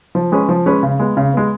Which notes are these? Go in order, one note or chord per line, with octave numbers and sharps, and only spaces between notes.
F3
G#3 C#4 G#4 B4
F3
G#3 C#4 G#4 B4
C#3
G#3 B3
C#3
G#3 B3